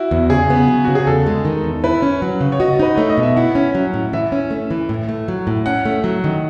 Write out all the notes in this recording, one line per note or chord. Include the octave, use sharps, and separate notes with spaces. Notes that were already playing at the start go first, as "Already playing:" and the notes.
Already playing: E4 F#4
E2
C#3 G#4
B3
F#3
C#3 F#4
G#4
E2 A4
G#3
D#3
E2
E4 B4
C#4
F#3
C#3
C#5
F#4 D#5
D#4 B4
A3 C#5
D#5
B2
E5
E4 F#5
C#4
F#3
A2
E3 E5
C#4
A3
E3
A2
A3
F#3
A2
C#4 F#5
A3
F#3
D#3